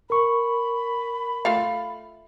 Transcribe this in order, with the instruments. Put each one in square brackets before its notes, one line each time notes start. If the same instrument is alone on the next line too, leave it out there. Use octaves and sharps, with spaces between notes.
[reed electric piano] A#4 C#6 [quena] B5
[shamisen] A3 F4 F5